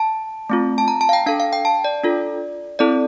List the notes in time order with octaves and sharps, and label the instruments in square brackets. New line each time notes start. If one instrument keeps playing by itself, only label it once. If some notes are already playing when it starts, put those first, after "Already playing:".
Already playing: [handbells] A5
A3 C4 F4
A5
A#5
A5
F5
G5
D4 A4 F5
F5
G5
A5
D5
D4 F4 A4
C4 E4 A4 D5